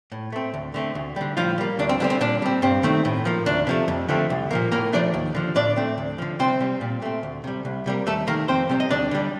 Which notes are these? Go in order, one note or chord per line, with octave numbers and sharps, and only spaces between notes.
A2
A3 C4
D2
D3 A3 C4
D2
D3 G3
A2 F3 F4
G3 A#3
D2 D4
C4
D3 G3 C4 D4
C4
A#2 D4
G3 C4
G2 C4
D#3 A3 C4
A2
F3 A#3
D2 D4
C3 F3 A3
F2
D3 F3 A3 C4
C2
A#2 F3 A#3
A2 A#3 A#4
F3 A3 D4 D5
D#2
D3 F3
A2 D4 D5
A3 C4
D2
D3 F3
C2 C4 C5
C3 G3
A#2
A3 C4
D2
C3 G3
C2
C3 G3 A#3
D#2 A3 A4
D#3 A3 A#3 A#4
F2 C4 C5
C3 G3 C4
D#5
D2 D4 D5
D3 G3